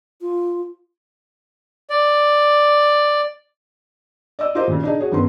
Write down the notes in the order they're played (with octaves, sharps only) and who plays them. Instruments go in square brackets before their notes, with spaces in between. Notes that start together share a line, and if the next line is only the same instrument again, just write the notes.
[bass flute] F4
[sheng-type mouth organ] D5
[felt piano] D5 D#5 E6
F4 G4 A#4 C5 D#5
A#2 C#3
D4 D#4 G#4
F#4 G#4 C#5
G1 G2 B3 C#4 A#4 C6